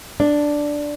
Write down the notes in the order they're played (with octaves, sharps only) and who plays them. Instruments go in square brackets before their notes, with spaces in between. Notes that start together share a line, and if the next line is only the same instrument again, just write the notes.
[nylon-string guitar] D4